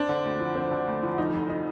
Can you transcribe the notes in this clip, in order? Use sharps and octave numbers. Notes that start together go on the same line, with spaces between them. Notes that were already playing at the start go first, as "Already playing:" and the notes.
Already playing: C4 D4
D3
D2
F3
C4
D3
D2
F3
F1 D#4
F2
D#4